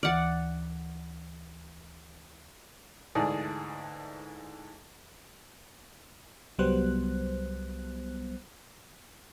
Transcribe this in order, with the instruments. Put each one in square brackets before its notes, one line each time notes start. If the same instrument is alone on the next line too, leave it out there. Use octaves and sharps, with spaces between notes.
[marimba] D2 E3 F6 [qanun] D5 F#5
[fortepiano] D2 G#2 E3 G#4 D5 A5
[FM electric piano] C2 F#3 G3 B3 C5 F#6